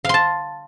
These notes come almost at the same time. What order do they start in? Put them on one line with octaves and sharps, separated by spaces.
F5 C6 A5